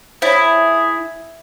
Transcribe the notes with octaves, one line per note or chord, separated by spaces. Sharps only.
E4 G#4 C5 C#5